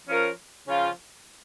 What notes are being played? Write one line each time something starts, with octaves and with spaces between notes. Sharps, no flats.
F3 C#4 F4 A#4 C#5
C#3 F3 C#4 F4